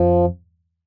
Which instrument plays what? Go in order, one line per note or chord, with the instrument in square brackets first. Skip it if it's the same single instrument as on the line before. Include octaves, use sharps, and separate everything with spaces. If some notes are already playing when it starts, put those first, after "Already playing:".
Already playing: [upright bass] F2 [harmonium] F3